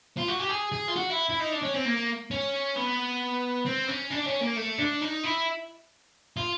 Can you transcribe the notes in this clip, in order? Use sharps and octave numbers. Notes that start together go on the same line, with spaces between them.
F4
F#4
G4
G#4
G#4
F4
F#4
E4
E4
D#4
D4
C#4
C4
A#3
C#4
B3
C4
C#4
D4
C#4
A#3
A3
D4
D#4
E4
F4